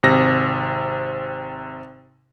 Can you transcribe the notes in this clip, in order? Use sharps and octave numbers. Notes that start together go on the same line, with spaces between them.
G#1 C3 A#6